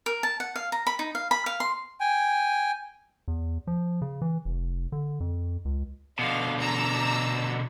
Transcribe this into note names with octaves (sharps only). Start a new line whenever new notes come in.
A#4
A5
F#5
F5
A#5
B5
D#4
F5
B5
F5
C6
G5 G#5
E2
F3
C#3
E3
F1
D3
F2
C#2
B2 D3 F5
A5 A#5 E6